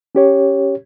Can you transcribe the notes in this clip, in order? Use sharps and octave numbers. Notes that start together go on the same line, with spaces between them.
C#4 G4 C#5